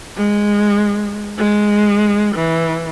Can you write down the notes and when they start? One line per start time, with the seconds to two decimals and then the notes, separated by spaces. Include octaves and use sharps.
0.17 G#3
1.38 G#3
2.35 E3